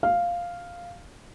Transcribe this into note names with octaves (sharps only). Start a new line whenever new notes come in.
F5